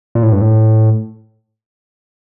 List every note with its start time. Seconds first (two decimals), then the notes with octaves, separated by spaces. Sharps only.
0.15 A#2
0.23 A2
0.32 G2
0.41 A2